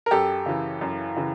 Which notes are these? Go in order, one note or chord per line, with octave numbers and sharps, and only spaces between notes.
A#4
F#2 G4 A4
C#3 E3
F#2
C#3 E3